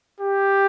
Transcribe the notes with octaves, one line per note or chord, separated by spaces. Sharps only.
G4